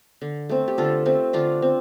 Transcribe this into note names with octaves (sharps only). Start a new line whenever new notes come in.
D3
A3 C4
G4
D3 F4 A4
A3 C4
D3 D4 F4
C4